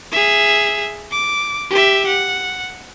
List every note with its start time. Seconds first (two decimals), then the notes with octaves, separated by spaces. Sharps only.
0.12 G#4 E5
1.11 D6
1.71 G4 E5
2.07 F#5